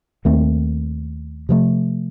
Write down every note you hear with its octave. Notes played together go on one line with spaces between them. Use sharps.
D#2 D#3 A3 C4
C3 F3 A3